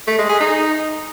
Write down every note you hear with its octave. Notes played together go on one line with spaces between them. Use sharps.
A3
G#3
G#4
D#4